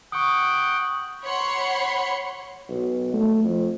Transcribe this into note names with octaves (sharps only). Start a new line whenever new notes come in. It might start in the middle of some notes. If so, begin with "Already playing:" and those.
F#5 G5 C#6 D#6
C#5 F#5 B5 C6 C#7
B1
A3
F2